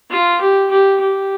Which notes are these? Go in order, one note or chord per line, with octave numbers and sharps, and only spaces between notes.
F4
G4
G4
G4